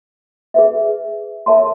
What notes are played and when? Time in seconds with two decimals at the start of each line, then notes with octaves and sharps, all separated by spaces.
0.54 G#4 B4 E5
1.46 A#4 C#5 E5 A5 C6